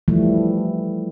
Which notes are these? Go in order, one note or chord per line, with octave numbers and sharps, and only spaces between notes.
E3 F3 G3 A3